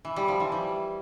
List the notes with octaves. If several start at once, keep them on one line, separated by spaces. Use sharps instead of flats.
E3
G3
F3
E3
G3